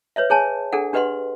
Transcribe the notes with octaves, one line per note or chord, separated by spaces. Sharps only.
B4 C#5 D#5 E5
G#4 C#5 G#5 A5
D4 G#4 A4 F#5
D4 G4 B4 D#5 F#5 C6